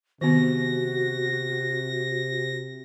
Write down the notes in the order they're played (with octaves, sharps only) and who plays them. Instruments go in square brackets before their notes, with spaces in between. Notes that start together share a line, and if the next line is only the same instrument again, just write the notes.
[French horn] C3 [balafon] D#3 B3 [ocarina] F#4 [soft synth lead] A#6